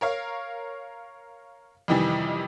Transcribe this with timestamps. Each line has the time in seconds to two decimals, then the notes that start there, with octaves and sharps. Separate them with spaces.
0.01 A#4 C#5 F5
1.88 F2 C3 D#3 E3 G3